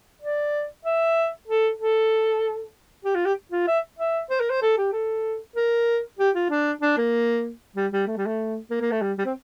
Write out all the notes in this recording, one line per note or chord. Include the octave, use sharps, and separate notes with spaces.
D5
E5
A4
A4
G4
F4
G4
F4
E5
E5
C5
A#4
C5
A4
G4
A4
A#4
G4
F4
D4
D4
A#3
G3
G3
A3
G3
A3
A#3
A#3
A3
G3
G3
C4